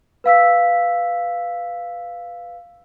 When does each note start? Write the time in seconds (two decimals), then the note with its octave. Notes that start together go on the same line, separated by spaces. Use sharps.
0.24 B4 F5 E6 B6